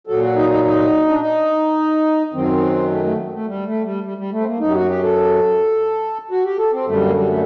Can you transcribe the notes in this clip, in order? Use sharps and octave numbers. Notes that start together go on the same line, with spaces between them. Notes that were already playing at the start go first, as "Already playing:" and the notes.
A#2 F#3 A4
F#4
D#4
D#4
D#4
D4
D#4
F#2 D#3 F#3 C4
A3
A3
A3
G3
A3
G3
G3
G3
A3
C4
A#3
F#2 F#3 D#4
G4
F#4
G4
A4
F#4
G4
A4
C4
F#2 D3 G3 A3
A#3
G3
A3